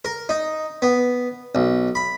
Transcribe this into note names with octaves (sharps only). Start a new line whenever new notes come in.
A#4
D#4
B3
B1
B5